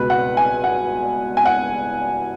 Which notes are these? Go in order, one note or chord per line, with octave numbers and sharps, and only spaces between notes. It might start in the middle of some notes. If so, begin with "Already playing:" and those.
Already playing: C#2 B2 B4
F#5
G#5
F#5
G#5
F#5